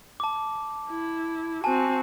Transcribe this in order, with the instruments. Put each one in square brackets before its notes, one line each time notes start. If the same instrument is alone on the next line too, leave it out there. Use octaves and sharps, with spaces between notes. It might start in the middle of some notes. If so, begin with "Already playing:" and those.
[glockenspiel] A5 D6
[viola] E4
[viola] C4 F#4 [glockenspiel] G#5 A5